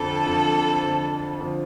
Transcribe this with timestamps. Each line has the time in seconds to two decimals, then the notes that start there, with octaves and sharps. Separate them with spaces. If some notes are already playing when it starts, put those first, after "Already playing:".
Already playing: F2 D3 F3 A4
0.26 F2 D3 F3
0.83 F2 D3 F3
1.40 F2 D3 F3